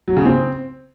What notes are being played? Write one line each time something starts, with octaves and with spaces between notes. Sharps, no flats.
F#3
C#3
C4